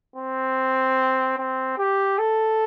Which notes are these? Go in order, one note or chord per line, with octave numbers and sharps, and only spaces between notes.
C4
C4
G4
A4